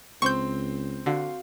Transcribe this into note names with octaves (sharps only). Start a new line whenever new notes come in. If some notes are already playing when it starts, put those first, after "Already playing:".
C#2 C4 C5 C#6 G6
D3 F#4 F5